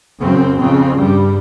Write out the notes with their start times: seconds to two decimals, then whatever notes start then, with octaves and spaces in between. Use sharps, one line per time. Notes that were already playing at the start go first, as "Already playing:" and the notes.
0.21 F#2 C#3 C4
0.58 F2 C#3 C4
0.96 G2 G3